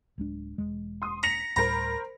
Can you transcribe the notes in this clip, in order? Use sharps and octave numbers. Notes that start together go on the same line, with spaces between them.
D1 G#3 D4
E1 G#3
C6 D#6
A#5 B6 C#7 F7
D2 A2 G3 A#4 C5 A#5 B5